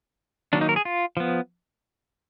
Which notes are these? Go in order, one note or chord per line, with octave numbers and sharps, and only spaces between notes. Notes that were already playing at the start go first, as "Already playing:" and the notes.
D#3 F#3 A#3 D4
D#4
A#4
G#4
F4
F3 B3